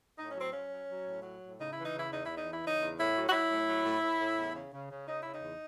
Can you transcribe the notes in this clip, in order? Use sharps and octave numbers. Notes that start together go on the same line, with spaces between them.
A2 D#4
C#4
F#3 C4
F#3 C#4
F#3
F#3
A2
F#3
A2
C#3 D#4
E3 E4
D#4
C#3
E4
E2 D#4
E2 E4
D#4
E3
E4
C#3 D#4
E2
A2 E4
F#3
F#4
F#3 E4
A2
F#3
A2
A2
A2
E2
C#3
C#3
C#3
C#3 D#4
C#3 E4
D#4
E2